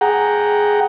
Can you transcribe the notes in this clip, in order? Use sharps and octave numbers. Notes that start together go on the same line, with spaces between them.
G#4 F#5 G5 A#5